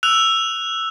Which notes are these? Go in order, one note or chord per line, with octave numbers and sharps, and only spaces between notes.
E6 F#6 F7